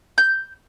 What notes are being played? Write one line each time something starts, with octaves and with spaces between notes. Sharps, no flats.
G6